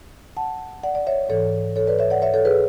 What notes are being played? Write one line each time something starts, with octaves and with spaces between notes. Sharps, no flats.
F#5 A5
D5 F#5
D5
C#5 E5
G#2 E3 A4 C#5
A4 C#5
B4 D5
C#5 E5
D5 F#5
C#5 E5
A4 C#5
G#4 B4